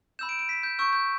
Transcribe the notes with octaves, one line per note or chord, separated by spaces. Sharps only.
B5 E6 G6 E7
D7
D7
B6
G6
C#6 E6 G6
G6